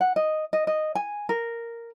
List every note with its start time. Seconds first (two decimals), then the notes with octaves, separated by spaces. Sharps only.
0.01 F#5
0.16 D#5
0.53 D#5
0.67 D#5
0.95 G#5
1.29 A#4